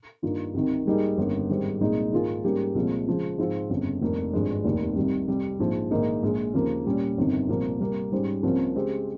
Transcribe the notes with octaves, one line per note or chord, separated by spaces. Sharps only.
G2 D#3 A#3 F4
C2 C3 D#3
G#2 G3 A#3 D#4 G#4
G1 F2 D#3 A#3
G#2 D#3 G3 C4
C2 A#2 G#3 D#4 G#4
G#2 D#3 A#3 F4 G#4
G#2 G3 A#3 C#4 G4
C2 A#2 F3 G#3
C#3 F3 G#3
G#2 F3 C4 F4
G1 F2 C#3
F1 F2 D#3 A#3
G#1 G2 F3 G#3
F1 D#2 D#3
C2 C3 D#3 G3
F2 C3 G3
A#1 G#2 F3
A#1 G#2 D#3 A#3 D#4
A#1 A#2 G#3
D#2 C#3 F3 A#3
A#2 G3 C#4
G1 F2 C3 D#3
C2 A#2 F3 A#3
C3 G3 A#3
G#2 G3 C#4 G#4 C5
C2 C3 F3 A#3 C#4
C#3 G#3 C4 G4